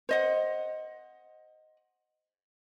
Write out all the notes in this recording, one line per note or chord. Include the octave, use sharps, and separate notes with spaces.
C5 D#5 F#5